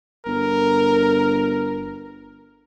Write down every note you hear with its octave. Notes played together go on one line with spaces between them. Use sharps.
G1 A#4